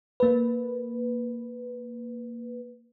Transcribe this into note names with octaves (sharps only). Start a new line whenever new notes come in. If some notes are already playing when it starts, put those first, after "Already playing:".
A#3 B4